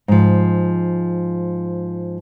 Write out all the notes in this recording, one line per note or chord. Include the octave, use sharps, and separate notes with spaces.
G#2 F3